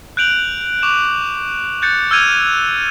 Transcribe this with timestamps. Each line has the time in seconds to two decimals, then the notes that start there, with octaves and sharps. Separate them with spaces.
0.17 F#6 G6 D7 F7 F#7
0.82 C#6 D6 E7 F7
1.82 F#6 G6 A6 C#7
2.11 E6 F6 G6 G#6 D#7 F7